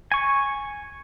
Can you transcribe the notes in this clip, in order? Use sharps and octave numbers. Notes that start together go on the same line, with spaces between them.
G#5 C#6